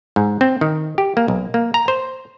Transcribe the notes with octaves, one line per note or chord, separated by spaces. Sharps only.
G#2
C4
D#3
G4
A#3
B1
A#3
A#5
C5